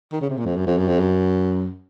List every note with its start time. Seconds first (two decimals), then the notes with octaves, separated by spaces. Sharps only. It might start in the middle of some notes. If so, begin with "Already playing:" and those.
0.12 D#3
0.21 C#3
0.30 C3
0.37 A#2
0.45 F2
0.56 F#2
0.66 F2
0.78 F#2
0.88 F2
0.99 F#2